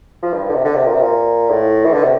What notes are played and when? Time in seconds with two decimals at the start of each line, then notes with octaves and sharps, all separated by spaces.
0.22 F3
0.34 G2
0.49 D3
0.55 C3
0.65 D3
0.75 C3
0.86 A#2
0.94 C3
1.01 A#2
1.50 A2
1.85 E3
1.94 D3
2.03 C3